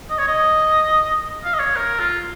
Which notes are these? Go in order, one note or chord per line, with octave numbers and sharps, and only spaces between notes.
D#5
C#5
D#5
F5
D#5
C#5
A#4
F4